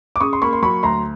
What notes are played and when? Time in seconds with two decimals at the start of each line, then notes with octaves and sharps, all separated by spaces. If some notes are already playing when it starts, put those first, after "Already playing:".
0.16 D6
0.20 C#3 C#6 D#6
0.33 C6
0.42 A#3 B5 C#6
0.53 C6
0.62 F#3 B5 C#6
0.83 D2 A#5 C6